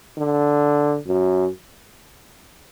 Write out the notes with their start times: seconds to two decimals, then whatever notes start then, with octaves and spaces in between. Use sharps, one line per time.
0.18 D3
1.07 F#2